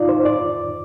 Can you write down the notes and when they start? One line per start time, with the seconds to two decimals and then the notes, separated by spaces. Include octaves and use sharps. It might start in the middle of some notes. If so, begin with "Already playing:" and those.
Already playing: D#4 F4 D5
0.09 C5
0.25 D5